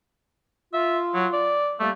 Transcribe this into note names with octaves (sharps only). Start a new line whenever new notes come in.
F4 E5
F#3
D5
G3 A3 A#3